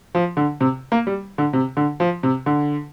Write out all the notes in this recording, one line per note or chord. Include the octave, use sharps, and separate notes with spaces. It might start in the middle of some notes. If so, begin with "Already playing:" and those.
F3
D3
C3
A#3
G3
D3
C3
D3
F3
C3
D3